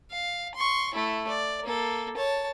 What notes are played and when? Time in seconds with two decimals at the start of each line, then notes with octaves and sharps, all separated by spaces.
0.11 F5
0.55 C6 C#6
0.94 A3 E4
1.28 D5
1.64 A#3 A4
2.17 C#5 A5